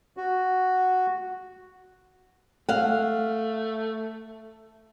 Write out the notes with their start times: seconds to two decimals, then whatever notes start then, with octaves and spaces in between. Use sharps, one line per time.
0.17 F#4
2.69 A3 F5 F#5